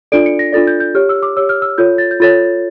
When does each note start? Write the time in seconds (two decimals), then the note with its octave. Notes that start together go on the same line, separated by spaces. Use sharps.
0.12 D4 F4 A4 D5 D7
0.26 C#7
0.39 A#6
0.53 D4 F4 A4 D5 A6
0.67 G6
0.80 G6
0.95 G4 C#5 F6
1.09 E6
1.23 D6
1.37 G4 C#5 E6
1.49 F6
1.62 E6
1.78 F4 A4 C#5 G6
1.98 A6
2.11 G6
2.20 F4 A4 C#5 A6